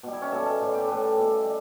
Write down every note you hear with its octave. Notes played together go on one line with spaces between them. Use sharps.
B2 G3
E4
C#4
B2 G3 A4
A4
A2 G3
G4
A4
A2 G3 B4
B2 G3
G3